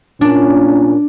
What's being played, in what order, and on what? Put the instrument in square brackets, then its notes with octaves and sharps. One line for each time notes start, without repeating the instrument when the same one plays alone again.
[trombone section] A#2 C#4 [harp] D4